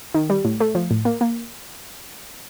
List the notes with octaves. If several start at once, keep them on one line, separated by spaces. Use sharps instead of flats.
D#3
G3
A2
A3
F3
A2
A#3
A#3